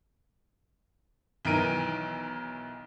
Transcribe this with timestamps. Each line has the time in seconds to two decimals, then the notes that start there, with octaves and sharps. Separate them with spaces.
1.45 B1 D#3 E3 A#4 D7 D#7